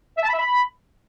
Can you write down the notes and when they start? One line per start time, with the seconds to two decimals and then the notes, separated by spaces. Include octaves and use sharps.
0.18 E5
0.23 A5
0.28 B5
0.34 E5
0.39 B5